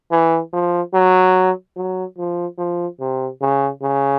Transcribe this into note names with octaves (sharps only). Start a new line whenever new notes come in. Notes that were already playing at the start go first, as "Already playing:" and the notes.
E3
F3
F#3
F#3
F3
F3
C3
C#3
C#3